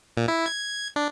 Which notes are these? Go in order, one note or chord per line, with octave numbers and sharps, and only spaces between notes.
A#2
E4
G#6
D4